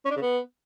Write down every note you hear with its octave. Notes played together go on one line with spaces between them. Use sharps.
C#4
D4
C#3
B3